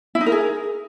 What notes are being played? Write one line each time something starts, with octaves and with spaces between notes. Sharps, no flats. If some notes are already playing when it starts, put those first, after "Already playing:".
E4
D#4
A#4
G#4